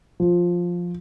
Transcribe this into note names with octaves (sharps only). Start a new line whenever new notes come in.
F3